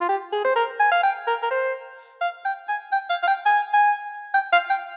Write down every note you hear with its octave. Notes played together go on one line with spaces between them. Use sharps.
F4
G4
G#4
C5
A#4
G#5
F5
G5
A#4
A#4
C5
F5
G5
G#5
G5
F5
F5
G5
G#5
G#5
G5
F5
G5